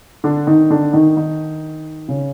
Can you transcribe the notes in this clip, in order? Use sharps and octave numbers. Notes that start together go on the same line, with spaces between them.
D3 D4
D#3 D#4
D3 D4
D#3 D#4
D#3 D#4
C#3 C#4